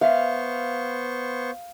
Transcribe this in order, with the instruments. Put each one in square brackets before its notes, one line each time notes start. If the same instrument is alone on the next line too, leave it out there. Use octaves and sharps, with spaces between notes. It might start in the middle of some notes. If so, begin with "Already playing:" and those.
[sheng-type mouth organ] B3 C5 C#6 [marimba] E5 [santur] F5